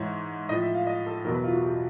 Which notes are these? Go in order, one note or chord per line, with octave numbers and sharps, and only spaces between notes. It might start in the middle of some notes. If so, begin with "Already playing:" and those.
Already playing: G#2 E3 C#5
A2 F3 D#5
E5
F5
D#5
A4
E2 B2 F#3 A#4
B4
F4
F#4
G4